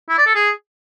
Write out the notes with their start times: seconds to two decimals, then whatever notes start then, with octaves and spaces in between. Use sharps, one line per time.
0.09 E4
0.18 D5
0.27 A4
0.35 G#4